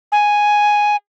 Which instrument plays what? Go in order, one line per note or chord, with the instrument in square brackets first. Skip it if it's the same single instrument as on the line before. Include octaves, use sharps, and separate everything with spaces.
[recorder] G#5